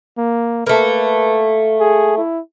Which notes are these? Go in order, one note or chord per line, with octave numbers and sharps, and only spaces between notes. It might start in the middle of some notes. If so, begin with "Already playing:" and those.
A#3
A3 A#3 B4
G#4
E4